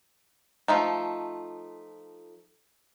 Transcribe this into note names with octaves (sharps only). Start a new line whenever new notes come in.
F3 A3 D#4